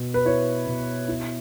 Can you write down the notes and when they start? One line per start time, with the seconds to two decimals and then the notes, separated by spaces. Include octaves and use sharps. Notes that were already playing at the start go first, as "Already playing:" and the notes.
Already playing: B2 B3
0.14 B4
0.25 E4 C#5
0.67 B2
1.08 E4